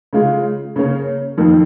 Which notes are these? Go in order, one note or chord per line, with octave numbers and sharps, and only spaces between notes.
C#3 G#3 F4
C#3 A#3 C#4
F2 D#3 A#3